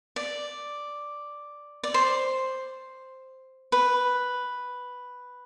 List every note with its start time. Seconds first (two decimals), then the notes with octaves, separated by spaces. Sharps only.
0.16 D5
1.83 D5
1.94 C5
3.72 B4